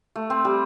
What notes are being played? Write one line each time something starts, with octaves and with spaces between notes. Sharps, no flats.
A3
C4
G3